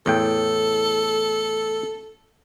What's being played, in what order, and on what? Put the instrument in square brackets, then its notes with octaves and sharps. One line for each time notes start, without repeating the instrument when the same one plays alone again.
[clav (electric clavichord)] E2 A2 G5 [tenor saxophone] A4